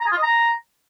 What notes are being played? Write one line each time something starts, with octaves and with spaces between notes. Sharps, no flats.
A#5
G#4
F4
D#5
A#5